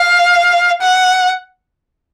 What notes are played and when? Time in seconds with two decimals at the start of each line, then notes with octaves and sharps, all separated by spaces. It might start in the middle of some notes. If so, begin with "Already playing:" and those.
Already playing: F5
0.82 F#5